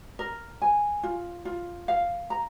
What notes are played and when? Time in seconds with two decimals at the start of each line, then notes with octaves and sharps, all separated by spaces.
0.19 A#4
0.62 G#5
1.03 F4
1.45 F4
1.88 F5
2.30 A#5